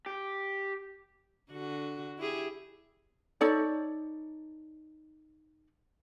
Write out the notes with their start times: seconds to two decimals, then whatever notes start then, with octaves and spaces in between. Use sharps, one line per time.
0.06 G4
1.52 D3 F#4
2.19 E4 G4 G#4
3.41 D#4 A4 C#5 D5